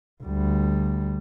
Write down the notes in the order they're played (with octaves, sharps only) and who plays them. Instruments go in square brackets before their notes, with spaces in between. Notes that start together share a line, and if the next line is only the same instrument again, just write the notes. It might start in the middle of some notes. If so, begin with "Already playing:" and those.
[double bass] D2 G3